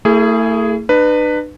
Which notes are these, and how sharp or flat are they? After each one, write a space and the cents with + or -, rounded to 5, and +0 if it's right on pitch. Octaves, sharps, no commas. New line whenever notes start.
A3 +40 E4 +0 G#4 +0
D4 +45 B4 +5